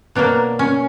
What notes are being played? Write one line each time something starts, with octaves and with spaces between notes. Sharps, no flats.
B2 F#3 A#3 D4
C#4